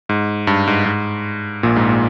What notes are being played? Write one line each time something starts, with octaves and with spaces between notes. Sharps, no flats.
G#2
G2
G#2
G#2
A#1 A#2
G#2
A#2